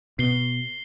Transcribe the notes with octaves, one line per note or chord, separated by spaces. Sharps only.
B2 C7 G7